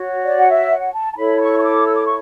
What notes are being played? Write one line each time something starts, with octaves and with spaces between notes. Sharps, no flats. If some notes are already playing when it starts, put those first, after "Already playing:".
Already playing: F#4 C#5
D5
F#5
E5
F#5
A5
A5
E4 A4 C#5 B5
C#6
C#6
D6
E6
D6
C#6